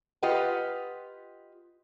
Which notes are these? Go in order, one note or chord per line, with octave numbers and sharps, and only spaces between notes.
F4 G4 B4 D#5 F#5